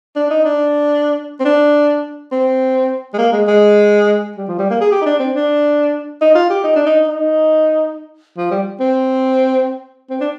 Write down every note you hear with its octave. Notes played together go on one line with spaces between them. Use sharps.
D4
D#4
D4
C4
D4
C4
G#3
A#3
G#3
G#3
G3
F3
G3
A#3
G#4
G4
D#4
D4
C4
D4
D#4
F4
G4
D#4
D4
D#4
D#4
F3
G3
C4
C4
D4